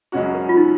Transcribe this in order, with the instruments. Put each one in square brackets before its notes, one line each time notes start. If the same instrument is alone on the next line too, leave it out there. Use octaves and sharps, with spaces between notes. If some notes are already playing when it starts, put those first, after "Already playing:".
[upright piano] F#2 C#3 G#3 C#4 F#4
[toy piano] A#4
F4
D#4